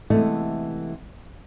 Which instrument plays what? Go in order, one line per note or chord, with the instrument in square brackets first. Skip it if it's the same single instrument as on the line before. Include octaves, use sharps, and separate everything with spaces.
[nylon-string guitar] C3 E3 G#3 A3 B3